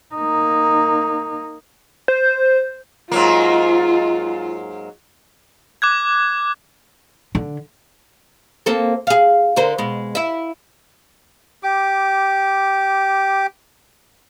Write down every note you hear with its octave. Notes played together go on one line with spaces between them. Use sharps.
A#3 D#4
C5
G#2 F#3 A#3 F4
D6 F#6 G#6
D3
A#3 C4 A4
G#4 F5
D3 A#4 C5
B2 G#3
E4 E5
G4 D6